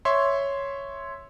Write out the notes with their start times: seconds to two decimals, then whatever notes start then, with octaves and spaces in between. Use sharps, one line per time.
0.05 C#5 E5 C6